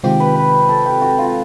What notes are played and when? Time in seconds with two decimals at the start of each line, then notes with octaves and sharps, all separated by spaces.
0.04 C3 D#3 G#3 C4 F4 G4
0.20 B4
0.36 B4
0.69 A4
0.86 G4
1.02 F#4
1.19 F4